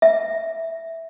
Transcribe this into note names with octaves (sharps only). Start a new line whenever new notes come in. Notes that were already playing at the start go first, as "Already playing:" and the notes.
E5